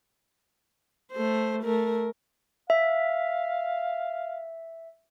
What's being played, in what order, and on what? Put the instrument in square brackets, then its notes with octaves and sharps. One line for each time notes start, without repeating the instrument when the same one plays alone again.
[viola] A3 C5
A3 A#4
[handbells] E5 [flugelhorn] F5